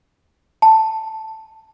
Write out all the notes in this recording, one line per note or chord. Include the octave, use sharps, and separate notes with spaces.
A5